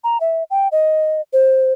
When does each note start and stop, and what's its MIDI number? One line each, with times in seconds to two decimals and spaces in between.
0.04 0.18 82
0.20 0.43 76
0.50 0.68 79
0.72 1.21 75
1.33 1.73 72